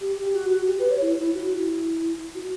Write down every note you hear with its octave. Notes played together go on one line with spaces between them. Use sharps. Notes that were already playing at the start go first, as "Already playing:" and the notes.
G4
G4
F#4
F#4
G4
B4
C#5
E4
E4
F#4
F#4
E4
F#4